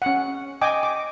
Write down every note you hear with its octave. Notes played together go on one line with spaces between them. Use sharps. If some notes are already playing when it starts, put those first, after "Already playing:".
C#4 F#5
D#5 G5 G#5 D6
D6